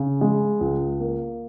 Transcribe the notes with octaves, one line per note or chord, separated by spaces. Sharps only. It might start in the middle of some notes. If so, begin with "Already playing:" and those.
Already playing: C#3
G#3
C#2
A#3